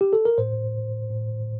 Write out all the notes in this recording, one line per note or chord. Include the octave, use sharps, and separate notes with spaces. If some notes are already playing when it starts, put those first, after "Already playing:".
G4
A4
A#4
A2 C5
A2